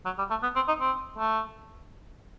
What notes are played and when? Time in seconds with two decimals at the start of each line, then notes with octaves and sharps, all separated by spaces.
0.06 F#3
0.18 G3
0.30 A3
0.43 B3
0.56 C4
0.68 D#4
0.81 C4
1.18 A3